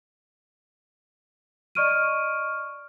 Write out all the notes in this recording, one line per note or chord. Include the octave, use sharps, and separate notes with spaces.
D5 D#5 C#6 F6 D7 D#7